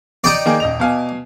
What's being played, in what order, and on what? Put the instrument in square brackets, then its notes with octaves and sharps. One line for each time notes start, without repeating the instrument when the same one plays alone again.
[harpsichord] D#4 G4 D5
[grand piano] D#3 A#3 G#4
D#1 D#5 F7
B2 F5 G#5